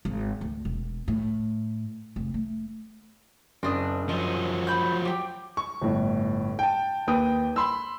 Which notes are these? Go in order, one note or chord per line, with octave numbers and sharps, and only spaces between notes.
G#1
D2
E1
A2
F1
A3
F#1 C4 D4 D#6
F3 F#3 D#5
B5 G6
G4 G5
C#6
G1 A2
G5 A5
D#2 B4 G5 D#6
B5 C6 E6